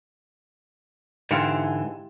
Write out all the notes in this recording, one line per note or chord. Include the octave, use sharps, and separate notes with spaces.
G#2 D3 E3 E4 F4 G4